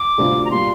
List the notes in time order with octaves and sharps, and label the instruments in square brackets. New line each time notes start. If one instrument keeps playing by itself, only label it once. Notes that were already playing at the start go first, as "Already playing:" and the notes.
Already playing: [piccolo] D6
[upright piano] D2 C3 G3 C4 F4
[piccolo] A#5
[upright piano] A#2 G3 [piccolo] C6